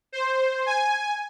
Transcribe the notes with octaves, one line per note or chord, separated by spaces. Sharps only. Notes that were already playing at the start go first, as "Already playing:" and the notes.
C5
G#5